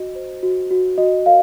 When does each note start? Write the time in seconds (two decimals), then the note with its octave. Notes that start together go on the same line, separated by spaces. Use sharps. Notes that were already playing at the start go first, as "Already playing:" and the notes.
Already playing: F#4 D#5
0.15 C5
0.43 F#4
0.71 F#4
0.98 F#4 D#5
1.26 A#4 F5